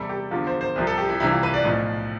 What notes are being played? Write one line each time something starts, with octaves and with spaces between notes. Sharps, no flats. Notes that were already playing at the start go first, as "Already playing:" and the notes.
Already playing: E2 C3 G3 A4
G4
E2 D3 F3 F4
C5
C5
C2 C3 F3
A4
G4
E4
C2 C3 E3 E4
F4
B4
D5
B1 A2 F3